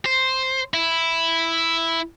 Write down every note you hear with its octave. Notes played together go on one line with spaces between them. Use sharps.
C5
E4